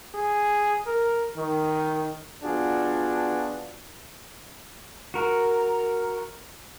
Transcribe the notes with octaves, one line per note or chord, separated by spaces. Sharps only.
G#4
A#4
D#3
F3 B3 D4 F4 F#4 G#4
F#4 A#4